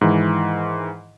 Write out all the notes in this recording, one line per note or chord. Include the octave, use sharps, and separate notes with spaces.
G#2 D#3 E3